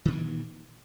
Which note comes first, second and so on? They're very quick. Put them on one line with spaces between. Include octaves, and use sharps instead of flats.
D#3 A#2 G2 E3